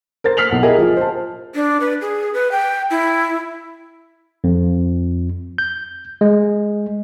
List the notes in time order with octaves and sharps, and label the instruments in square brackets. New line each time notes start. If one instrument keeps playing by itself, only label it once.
[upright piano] A#4 C5 A6
F6 B6 C7 F7 F#7
B1 F#5
E4 G4 G#4 A#4 D#5 E5
F3
C5 A5
[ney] D4
B4
G#4
B4
G5
E4
[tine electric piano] F2
G6
G#3